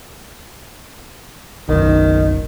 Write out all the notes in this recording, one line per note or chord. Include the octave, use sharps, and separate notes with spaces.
F#1 B1 D#3